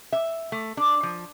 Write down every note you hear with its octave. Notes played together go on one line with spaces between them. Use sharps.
E5
A3
D4
F3